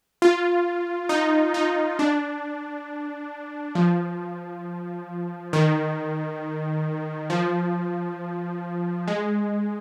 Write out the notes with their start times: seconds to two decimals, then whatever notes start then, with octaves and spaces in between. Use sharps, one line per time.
0.22 F4
1.09 D#4
1.54 D#4
1.99 D4
3.75 F3
5.53 D#3
7.30 F3
9.08 G#3